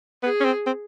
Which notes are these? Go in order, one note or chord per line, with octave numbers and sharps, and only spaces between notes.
B3 G#4
C#4
C4
C4